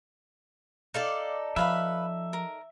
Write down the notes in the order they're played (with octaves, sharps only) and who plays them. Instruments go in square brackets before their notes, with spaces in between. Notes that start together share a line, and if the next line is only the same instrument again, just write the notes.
[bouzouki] D#4 A4 D5 [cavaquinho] F5
[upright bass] F3 [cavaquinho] B4 F5 B5 [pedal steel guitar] E5
[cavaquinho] A#4